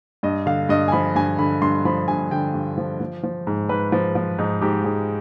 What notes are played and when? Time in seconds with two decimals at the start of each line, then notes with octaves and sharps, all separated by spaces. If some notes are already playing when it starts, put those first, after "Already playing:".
0.23 G2 D#5
0.46 D3 F5
0.69 G2 D#5
0.88 G#5
0.92 F3 B5
1.15 G2 G#5
1.39 D3 B5
1.61 G2 C6
1.85 F3 B5
2.08 G2 G#5
2.31 D3 G5
2.54 G2
2.78 F3
3.00 F3
3.23 F3
3.47 G#2
3.69 G#2 B4
3.92 F3
4.15 F3
4.38 G#2 D#4
4.61 G#2 G4
4.84 F3 G#4